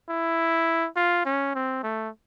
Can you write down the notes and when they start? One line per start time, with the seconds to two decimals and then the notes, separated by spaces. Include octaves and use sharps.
0.09 E4
0.96 F4
1.25 C#4
1.55 C4
1.83 A3